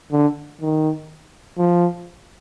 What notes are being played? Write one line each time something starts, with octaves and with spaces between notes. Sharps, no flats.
D3
D#3
F3